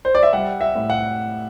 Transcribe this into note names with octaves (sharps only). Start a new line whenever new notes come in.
C5
D5
E5
G3 F#5
E5
A2
F#5